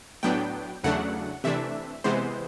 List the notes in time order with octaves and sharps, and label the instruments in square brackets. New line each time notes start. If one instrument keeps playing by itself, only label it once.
[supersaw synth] A2 F#3 B3 D4 G5
E2 C#3 F#3 A3 D4 F#5
C3 E3 A3 D4 E5
C3 E3 G#3 B3 C5